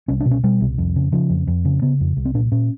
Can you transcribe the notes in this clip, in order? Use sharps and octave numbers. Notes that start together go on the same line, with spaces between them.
C2 C#4
D4
B2
C#4
B2 G3
C2
F2
C#3
C#3 F3
F2
F2
C#3
C#3 B3
F2
C2
C4
A#2 D4
A#2 C#4